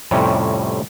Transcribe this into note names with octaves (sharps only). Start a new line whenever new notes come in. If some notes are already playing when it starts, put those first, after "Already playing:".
F2 A2 C3 G3 C#4